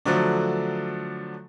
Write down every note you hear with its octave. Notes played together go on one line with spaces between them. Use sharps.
D3 F3 F#3 A3 D4